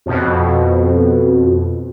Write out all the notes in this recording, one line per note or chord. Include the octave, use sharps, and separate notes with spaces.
F2 B2